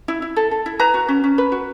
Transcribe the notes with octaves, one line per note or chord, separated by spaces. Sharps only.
E4
E4
A4
A4
E4
B4 A#5
F#4
C#4
C#4
B4
F#4